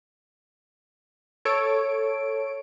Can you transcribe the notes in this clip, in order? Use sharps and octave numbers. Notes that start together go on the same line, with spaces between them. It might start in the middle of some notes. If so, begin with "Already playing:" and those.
A4 C#5 D7